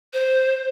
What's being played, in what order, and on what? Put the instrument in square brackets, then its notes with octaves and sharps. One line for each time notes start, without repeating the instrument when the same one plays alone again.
[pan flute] C5